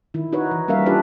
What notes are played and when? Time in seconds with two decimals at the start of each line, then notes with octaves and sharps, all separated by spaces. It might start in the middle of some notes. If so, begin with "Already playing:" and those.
0.14 D#3 E4
0.32 D#4 F#4 B4 C#5
0.51 E3
0.68 G3 A#3 C#4 A#4 E5 F5
0.86 D4 F4 G4 A4 B4 D5